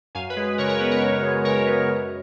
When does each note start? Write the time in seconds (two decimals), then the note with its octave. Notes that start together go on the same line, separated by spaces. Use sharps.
0.15 F#2 F5 G#5
0.30 B4
0.36 G#3
0.44 B4
0.58 C#3 A#4 C#5
0.69 A#4 C#5
0.80 B3 B4
0.91 A#4 C#5
1.01 F#2
1.23 G#3
1.45 C#3 A#4 C#5
1.67 B3
1.89 F#2